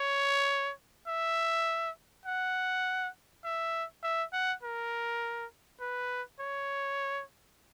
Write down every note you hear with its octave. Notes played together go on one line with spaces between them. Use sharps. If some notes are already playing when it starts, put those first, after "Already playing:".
Already playing: C#5
E5
F#5
E5
E5
F#5
A#4
B4
C#5